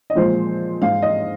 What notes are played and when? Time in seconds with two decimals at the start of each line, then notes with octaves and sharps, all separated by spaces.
0.10 D#5
0.15 A#2 F3 G#3 C5
0.82 G#2 G#3 F5
1.02 D#5